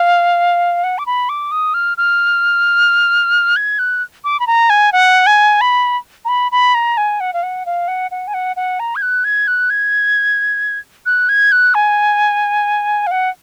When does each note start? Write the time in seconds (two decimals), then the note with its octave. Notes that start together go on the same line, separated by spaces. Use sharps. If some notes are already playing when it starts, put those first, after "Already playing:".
Already playing: F5
0.84 F#5
0.98 D6
1.06 B5
1.29 D6
1.51 D#6
1.74 F6
1.97 F6
3.56 G#6
3.79 F#6
4.24 D6
4.40 B5
4.47 A#5
4.70 G#5
4.93 F#5
5.27 G#5
5.61 B5
6.25 A#5
6.29 B5
6.52 B5
6.75 A#5
6.97 G#5
7.20 F#5
7.34 F5
7.43 F#5
7.66 F5
7.88 F#5
8.11 F#5
8.28 G#5
8.34 F#5
8.56 F#5
8.80 A#5
8.96 G#6
9.02 F#6
9.24 G#6
9.48 F#6
9.70 G#6
11.06 F#6
11.29 G#6
11.52 F#6
11.74 G#5
13.07 F5
13.11 F#5